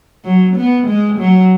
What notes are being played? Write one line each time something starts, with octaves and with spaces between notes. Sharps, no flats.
F#3
B3
G#3
F#3